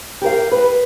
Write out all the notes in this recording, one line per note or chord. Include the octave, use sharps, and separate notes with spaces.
G4 A#4 F5
B4